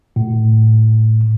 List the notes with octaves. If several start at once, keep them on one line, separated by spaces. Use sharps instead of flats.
A2